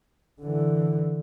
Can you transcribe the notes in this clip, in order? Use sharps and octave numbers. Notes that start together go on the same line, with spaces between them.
D3 E3